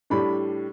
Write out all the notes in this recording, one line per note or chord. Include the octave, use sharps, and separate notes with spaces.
A2 G3 D4 B5